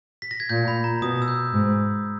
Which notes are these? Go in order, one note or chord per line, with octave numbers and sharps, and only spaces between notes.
B6
A#6
G#6
A#2 G6
B5
A#5
B2 D#6
E6
G6
G#2